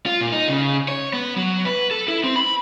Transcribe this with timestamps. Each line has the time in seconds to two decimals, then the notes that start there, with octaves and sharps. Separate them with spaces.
0.06 F4
0.21 A#2
0.32 D#4
0.49 C#3
0.88 C#5
1.13 B3
1.36 F#3
1.65 B4
1.91 A4
2.08 E4
2.24 C4
2.36 B5